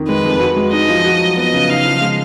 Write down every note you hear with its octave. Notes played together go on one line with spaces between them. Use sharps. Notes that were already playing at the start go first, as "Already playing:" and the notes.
Already playing: F2 D#3
G#3 B4
F2
F#4
G#3
D#4 D#5
F3
F#4
F#3
B3 D#5
C#3
D#4 F5
F3
G#3